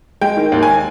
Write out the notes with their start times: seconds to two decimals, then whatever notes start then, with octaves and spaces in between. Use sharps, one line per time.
0.22 G#3 G5
0.37 D#3
0.52 D#2
0.63 G#5